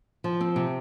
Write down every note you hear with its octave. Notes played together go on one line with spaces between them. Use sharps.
F3
C4
C3